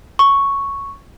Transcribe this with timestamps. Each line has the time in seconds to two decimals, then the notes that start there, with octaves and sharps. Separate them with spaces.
0.19 C#6